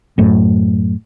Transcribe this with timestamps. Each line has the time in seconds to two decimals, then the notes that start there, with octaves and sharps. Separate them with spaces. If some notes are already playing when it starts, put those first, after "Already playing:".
0.18 F#2 A2